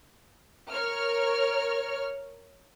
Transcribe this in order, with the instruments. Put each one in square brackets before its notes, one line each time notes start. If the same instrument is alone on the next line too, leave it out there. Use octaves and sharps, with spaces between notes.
[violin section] A#4 C#5 F6